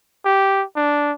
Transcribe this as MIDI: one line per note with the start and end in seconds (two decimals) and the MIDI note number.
0.25 0.64 67
0.76 1.12 62